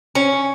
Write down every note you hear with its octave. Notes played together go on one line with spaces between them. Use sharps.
C#4